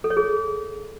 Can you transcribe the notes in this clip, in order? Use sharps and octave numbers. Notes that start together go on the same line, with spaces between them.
A4
C#5
G#4